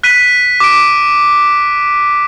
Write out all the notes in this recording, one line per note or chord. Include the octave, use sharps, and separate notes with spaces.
F#6 B6 D#7
D6 D7